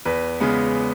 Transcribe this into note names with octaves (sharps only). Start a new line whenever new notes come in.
E2 B4
C#3 G#3 B3